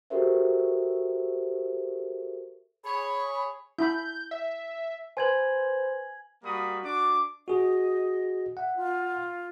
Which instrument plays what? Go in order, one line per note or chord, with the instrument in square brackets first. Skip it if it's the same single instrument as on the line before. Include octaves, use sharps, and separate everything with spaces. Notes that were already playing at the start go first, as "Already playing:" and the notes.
[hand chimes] F#4 G4 A4 A#4 C5 E5
[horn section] G#4 C#5 [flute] B5
[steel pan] E4 B5 [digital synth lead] G6
[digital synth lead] E5
[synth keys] B4 C5 [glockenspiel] G#5 G#6 F#7
[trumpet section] G3 A#3 F#4 B5 D#6
D4 F#4 D6
[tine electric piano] F#4 G#4 [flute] D#5
[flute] E5 [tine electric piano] F#5
[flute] F4